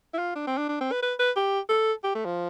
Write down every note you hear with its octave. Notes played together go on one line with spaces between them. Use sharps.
E4
F4
D4
C4
D4
D4
C4
B4
B4
B4
G4
A4
G4
A3
F3